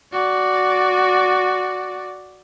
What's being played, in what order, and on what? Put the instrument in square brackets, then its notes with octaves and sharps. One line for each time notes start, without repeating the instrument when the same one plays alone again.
[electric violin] F#4 D5